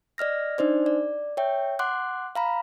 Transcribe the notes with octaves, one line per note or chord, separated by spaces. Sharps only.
D5 D#5 F6 A#6
D4 D#4 C5 D5
D5
C#5 E5 G5
F#5 C6 D6 F#6
F5 A#5 B5